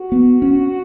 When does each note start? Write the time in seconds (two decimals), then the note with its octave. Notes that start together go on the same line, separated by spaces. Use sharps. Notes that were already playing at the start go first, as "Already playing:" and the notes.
Already playing: F#4
0.12 B3
0.42 C#4